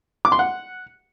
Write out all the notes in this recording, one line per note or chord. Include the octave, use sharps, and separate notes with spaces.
D6
C6
F#5